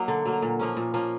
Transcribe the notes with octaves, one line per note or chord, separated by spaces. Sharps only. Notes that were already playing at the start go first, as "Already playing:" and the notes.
Already playing: F#3 A#3 D#4
D3
F#3 A#3
A#2
F3 A#3 C#4
A#2
F3 A#3 C#4